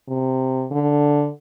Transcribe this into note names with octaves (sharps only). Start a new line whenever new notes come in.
C3
D3